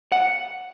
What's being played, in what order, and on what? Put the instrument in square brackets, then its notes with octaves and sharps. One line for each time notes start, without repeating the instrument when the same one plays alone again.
[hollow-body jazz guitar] F#5